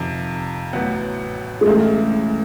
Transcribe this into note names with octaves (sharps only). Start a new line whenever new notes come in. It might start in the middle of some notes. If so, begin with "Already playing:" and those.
Already playing: F2 C3 D#3
A1 A2 F#3 B3
G#3
C#2 C#3 E3 A3